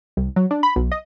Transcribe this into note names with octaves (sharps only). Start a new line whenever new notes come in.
C2
F#3
D4
B5
B1
D#5